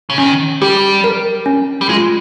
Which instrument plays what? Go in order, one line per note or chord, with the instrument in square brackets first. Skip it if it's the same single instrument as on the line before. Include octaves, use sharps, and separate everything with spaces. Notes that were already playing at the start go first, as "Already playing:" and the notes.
[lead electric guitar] C#3
[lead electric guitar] D#3 [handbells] C#4
[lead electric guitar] G3 [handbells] G4
[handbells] A#4
C#4
[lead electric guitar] G3
[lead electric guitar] G#3 [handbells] F4